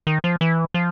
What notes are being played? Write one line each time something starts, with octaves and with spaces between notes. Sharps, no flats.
D#3
F3
E3
F3